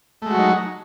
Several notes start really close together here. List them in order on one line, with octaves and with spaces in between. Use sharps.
A3 G#3 F#4 F#3 D#4